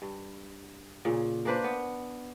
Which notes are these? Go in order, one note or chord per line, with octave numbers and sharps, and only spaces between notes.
G2
A#2 C#3
A#3 D4 B4 C5
B3